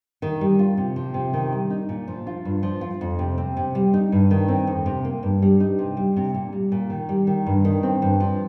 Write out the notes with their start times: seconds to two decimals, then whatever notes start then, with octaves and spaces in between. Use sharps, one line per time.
0.22 D#3
0.41 G3
0.59 F4
0.77 C3
0.96 F3
1.14 C3
1.33 D#3
1.52 G3
1.70 D#4
1.89 A#2
2.08 F3
2.27 F4
2.45 G2
2.63 F3
2.81 F4
3.01 F2
3.19 C3
3.38 C4
3.57 C3
3.75 G3
3.93 D#4
4.12 G2
4.31 D#3
4.48 C4
4.67 F2
4.86 C3
5.05 A#3
5.23 G2
5.42 G3
5.60 D#4
5.78 C3
5.97 G3
6.16 C3
6.34 A#2
6.53 G3
6.72 A#2
6.90 D#3
7.09 G3
7.27 D#3
7.46 G2
7.65 D#3
7.83 C4
8.02 G2
8.20 F3